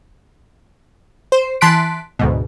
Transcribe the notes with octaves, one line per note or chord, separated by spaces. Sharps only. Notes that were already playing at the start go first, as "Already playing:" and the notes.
C5
E3 A5 C6 F#6 B6 D7
D2 G#2 B2